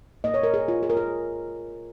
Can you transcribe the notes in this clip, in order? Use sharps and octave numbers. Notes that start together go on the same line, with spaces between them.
A#2 A#3 D#5
C#5
A#4
G#4
F4
G#4
A#4
G#4